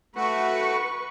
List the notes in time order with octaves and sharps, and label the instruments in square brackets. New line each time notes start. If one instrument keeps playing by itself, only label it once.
[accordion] A3 F#4 [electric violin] B4 C#6